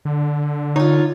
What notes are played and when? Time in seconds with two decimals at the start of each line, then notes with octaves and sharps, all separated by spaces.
0.05 D3
0.76 D#4 F4 C#5